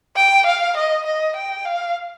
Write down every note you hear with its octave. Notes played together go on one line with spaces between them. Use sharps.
G5
F5
D#5
D#5
G5
F5